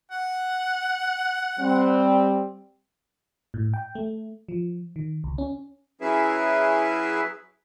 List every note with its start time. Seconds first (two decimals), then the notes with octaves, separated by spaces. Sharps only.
0.11 F#5
1.58 G3 C4
3.54 A2
3.74 G5
3.95 A3
4.48 F3
4.96 D#3
5.24 C#2
5.38 C#4
6.01 F#3 C#4 E4 G#4 B4 E5